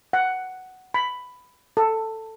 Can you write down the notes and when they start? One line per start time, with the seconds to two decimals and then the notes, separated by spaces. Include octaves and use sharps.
0.13 F#5
0.94 B5
1.77 A4